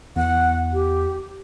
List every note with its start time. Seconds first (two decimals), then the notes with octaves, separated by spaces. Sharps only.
0.16 E2 F#5
0.73 G4